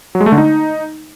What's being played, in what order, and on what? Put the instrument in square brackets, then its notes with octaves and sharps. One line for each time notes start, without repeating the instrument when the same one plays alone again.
[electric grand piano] F#3
G#3
A3
D3
D#4